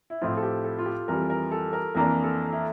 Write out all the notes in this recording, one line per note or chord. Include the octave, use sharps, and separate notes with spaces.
E4
A2 F3 C4 E4 F4
A4
G4
A4
F4
G4
F2 E3 G3 A#4
A#4
A4
A#4
F2 E3 A#3 D4 A#4
A4
E4